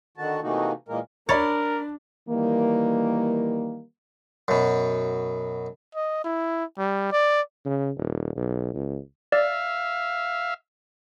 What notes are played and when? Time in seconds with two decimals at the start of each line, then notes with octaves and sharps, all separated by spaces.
0.17 D3 D#3 F#4 A5
0.42 C3 E3 A3 A#3 D#4 F#4
0.88 A#2 E3 G#3 A#3 A#4
1.29 D4 A#4 C#5 D5 B5 A6
2.28 D#3 E3 G3 A#3
4.48 F#2 B2
5.95 D#5
6.24 E4
6.78 G3
7.12 D5
7.65 C#3
7.98 D#1
8.36 B1
8.74 C#2
9.32 D5 E5 F5